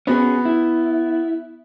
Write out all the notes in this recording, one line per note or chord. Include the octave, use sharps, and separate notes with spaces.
B3 C#4 F#4 G#4
E4